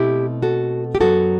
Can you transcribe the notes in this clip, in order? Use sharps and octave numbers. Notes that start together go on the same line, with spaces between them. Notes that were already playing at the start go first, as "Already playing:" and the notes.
Already playing: B2 A3 C4 E4 G4
F#4 A4
G4
F#2 F#3 B3 F#4 A4